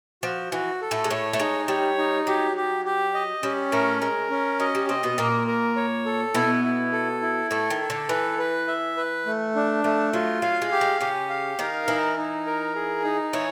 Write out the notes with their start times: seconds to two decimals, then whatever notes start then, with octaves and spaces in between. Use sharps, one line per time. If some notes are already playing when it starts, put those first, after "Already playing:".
0.23 F3 F#4
0.52 E3 F#4
0.82 A4
0.91 A2 A3
1.04 G#3
1.11 A2 A3 C#5
1.33 A3
1.40 G#3 D#4
1.68 G3 C#5
1.98 D#4
2.27 F#3 G4
2.57 G4
2.85 G4
3.14 D#5
3.43 G3 C#4
3.72 A2 A3 A#4
4.01 G#3 A#4
4.30 C#4
4.60 F#3 D#5
4.75 G3
4.89 C3 C4 D#5
5.03 B2 B3
5.18 A#2 A#3 A#4
5.47 A#4
5.76 C#5
6.05 A4
6.34 B2 B3 E4
6.64 E4
6.92 A4
7.22 E4
7.51 A2 A3 A4
7.70 D#3
7.81 A4
7.90 D3
8.09 E3 B4
8.39 B4
8.67 E5
8.97 B4
9.26 A3
9.55 D4
9.84 F3 A3
10.13 F#3 F4
10.42 F#3 F5
10.62 G#3
10.71 G4
10.81 G#3
11.01 C#3 C#4 G4
11.30 F5
11.59 D#3 D#4 A#4
11.88 E3 D#4 E4
12.17 D#4
12.47 A#4
12.75 G#4
13.04 D#4
13.33 E3 E4 C#5